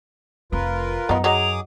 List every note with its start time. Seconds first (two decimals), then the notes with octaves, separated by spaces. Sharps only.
0.52 F1 C4 F4 A#4 B4
1.09 F#2 B3 D#4
1.24 F#3 D#4 G#4 D6 D#6 F7